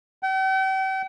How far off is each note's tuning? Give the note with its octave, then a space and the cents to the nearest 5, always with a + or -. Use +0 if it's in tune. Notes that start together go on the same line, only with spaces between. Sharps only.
G5 -45